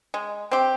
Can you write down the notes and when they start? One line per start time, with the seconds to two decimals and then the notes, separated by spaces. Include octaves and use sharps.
0.14 G#3
0.52 C4 G4